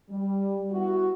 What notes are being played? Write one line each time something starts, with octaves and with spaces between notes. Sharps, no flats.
G3
G3 B3 E4 F#4